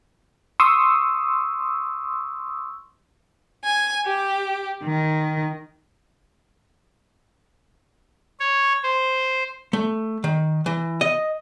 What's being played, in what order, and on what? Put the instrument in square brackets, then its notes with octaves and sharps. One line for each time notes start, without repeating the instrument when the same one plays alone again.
[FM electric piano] C6 C#6 D#6 E6
[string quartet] G#5
G4
D#3
[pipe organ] C#5
C5
[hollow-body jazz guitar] A3
D#3
E3
D#5